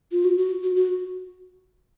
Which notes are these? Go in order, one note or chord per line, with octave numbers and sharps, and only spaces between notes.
F4
F#4
F#4
F#4
F#4